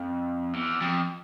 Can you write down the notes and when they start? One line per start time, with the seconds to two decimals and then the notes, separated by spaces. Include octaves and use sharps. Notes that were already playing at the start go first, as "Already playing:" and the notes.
Already playing: F2
0.54 E2
0.82 F2